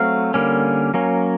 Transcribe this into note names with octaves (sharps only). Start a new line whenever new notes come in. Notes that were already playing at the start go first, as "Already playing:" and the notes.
Already playing: F#3 A3 C4 F5
D3 G3 A#3 C#4
F#3 A#3 C#4